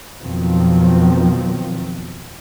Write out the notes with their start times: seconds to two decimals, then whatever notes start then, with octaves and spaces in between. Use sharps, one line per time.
0.22 F2 B2 D#3 F3 F#3 C4